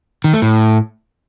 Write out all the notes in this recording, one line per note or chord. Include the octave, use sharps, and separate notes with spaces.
D#3
A3
A2